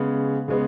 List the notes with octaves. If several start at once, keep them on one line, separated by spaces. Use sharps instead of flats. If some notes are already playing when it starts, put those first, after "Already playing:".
Already playing: C#3 G#3 B3
C#3 G#3 B3